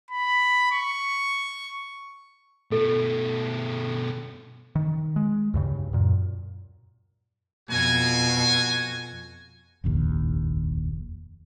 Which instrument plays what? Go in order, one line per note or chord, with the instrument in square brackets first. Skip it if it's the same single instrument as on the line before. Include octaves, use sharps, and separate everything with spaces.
[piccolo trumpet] B5
C#6
[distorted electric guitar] B2 A3 [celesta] A4
[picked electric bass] D#3
G#3
D2 G2 C#3
F#2 A#2
[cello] F2 B2 [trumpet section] F#4 G#5
[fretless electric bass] F1 A#1 D#2